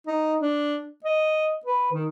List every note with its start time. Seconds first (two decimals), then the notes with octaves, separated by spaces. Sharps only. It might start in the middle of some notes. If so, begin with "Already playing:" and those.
0.07 D#4
0.41 D4
1.05 D#5
1.66 B4
1.92 D#3